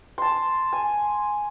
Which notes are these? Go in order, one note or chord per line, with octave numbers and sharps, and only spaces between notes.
A5 C6
G#5